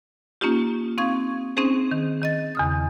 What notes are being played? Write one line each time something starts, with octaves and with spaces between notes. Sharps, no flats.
A#3 C#4 D#4 F4 G4
C4 D#4 F5 C#6 G#6
C4 C#4 D#4 G#4 C5
D#3
D#3 D#5 A6
E2 C#3 D#6